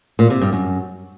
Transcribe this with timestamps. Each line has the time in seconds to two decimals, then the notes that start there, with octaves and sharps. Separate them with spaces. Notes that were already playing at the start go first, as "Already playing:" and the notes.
0.19 A#2
0.30 C3
0.41 G2
0.53 F#2